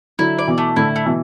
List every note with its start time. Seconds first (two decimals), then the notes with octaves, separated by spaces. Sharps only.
0.19 D3 F#3 E4
0.39 D5
0.47 B2 E3
0.58 A3
0.76 A2 D3 E4
0.96 A3
1.06 B2 E3